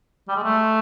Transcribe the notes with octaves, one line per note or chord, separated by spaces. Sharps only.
G3
G#3
A3